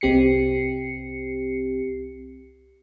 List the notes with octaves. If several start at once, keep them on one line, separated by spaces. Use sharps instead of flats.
C2 C4 G4 C7 C#7